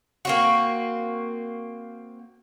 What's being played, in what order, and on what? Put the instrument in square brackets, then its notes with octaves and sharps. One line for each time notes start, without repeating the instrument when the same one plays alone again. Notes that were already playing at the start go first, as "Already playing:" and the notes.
[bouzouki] A#3 C4 F#4